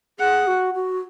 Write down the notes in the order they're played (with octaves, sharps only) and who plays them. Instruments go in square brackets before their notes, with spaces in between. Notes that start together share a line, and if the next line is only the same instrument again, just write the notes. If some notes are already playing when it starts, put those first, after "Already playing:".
[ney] G#4 [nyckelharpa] F#5
[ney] F#4
F#4